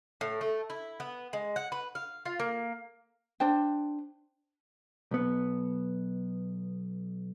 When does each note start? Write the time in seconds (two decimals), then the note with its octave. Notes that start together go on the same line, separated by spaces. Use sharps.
0.21 A2
0.41 A3
0.70 E4
1.00 B3
1.33 G#3
1.56 F#5
1.72 B4
1.95 F5
2.25 F4
2.40 A#3
3.40 D4 C5 G5
5.11 B1 B3